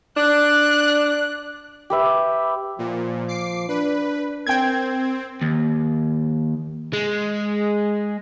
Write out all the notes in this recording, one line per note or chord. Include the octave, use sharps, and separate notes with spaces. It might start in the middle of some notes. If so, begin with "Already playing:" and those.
D4 F#6
G4 B4 E5
A#2 F3
D6 C7
D4 B4
C4 A#4 G5 G#6
D#2
G#3